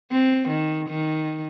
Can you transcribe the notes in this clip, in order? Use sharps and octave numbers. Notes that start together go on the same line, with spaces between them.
C4
D#3
D#3